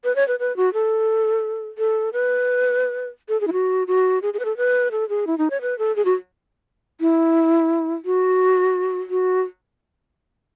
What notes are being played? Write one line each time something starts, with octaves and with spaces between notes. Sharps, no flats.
B4
C#5
B4
B4
F#4
A4
A4
B4
A4
G#4
E4
F#4
F#4
G#4
G#4
B4
A4
B4
A4
G#4
E4
D#4
C#5
B4
A4
G#4
F#4
E4
F#4
F#4